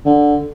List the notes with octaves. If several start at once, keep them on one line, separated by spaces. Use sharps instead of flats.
D3